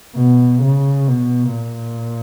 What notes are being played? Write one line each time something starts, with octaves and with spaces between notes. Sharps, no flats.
B2
C#3
B2
A#2